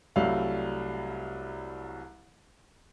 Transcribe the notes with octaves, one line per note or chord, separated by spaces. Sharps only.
C2 F#3 G3 A3 F5